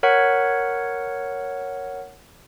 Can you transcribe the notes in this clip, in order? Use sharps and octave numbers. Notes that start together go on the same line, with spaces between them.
A#4 C#5 F#5